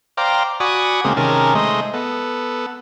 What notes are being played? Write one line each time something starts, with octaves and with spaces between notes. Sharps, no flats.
C5 D5 F5 G5 A#5
F#4 D5 G#5 B5 C#6 D#6
C#3 G#3 A#3 C4
C3 D#3 C#4 G#4 A#4 A5
G#3 A3 C5 D#5
B3 A4